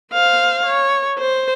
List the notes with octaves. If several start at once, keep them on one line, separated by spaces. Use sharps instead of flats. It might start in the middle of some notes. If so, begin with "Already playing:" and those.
C5 F5
C#5
C5